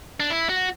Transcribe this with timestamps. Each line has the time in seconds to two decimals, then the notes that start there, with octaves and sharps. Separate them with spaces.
0.20 D4
0.30 E4
0.49 F#4